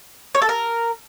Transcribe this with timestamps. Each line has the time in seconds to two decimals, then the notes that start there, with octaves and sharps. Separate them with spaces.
0.35 C#5
0.42 A4
0.49 A#4